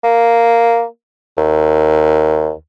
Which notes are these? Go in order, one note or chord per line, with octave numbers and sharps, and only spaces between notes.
A#3
D#2